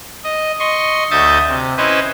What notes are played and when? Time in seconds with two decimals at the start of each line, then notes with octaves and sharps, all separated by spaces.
0.24 D#5
0.60 D#5 C6 C#6
1.11 D2 D#5 E5 D#6 G6 A6
1.48 C3
1.77 C#4 E4 B4 C5 D#5 E5